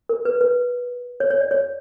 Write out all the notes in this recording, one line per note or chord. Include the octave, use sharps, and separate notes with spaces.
A#4
B4
B4
C#5
C#5
D5
C#5